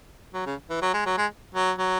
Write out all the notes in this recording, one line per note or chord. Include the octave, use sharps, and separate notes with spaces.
F#3
C#3
E3
F#3
G#3
F#3
G#3
F#3
F#3